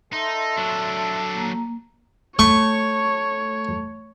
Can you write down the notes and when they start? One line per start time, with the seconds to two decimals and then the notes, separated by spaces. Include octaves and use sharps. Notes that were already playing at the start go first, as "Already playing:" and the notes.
0.13 D#4 A4 E5 C6
0.57 F#3 D4
1.35 A#3 A#5
2.39 A3 C#5 C#6